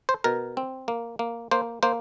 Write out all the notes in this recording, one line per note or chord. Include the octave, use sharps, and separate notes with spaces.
C5
B2 A#4
C4
A#3
A#3
A#3 C5
A#3 C5